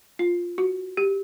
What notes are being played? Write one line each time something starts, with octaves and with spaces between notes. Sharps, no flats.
F4
F#4
G4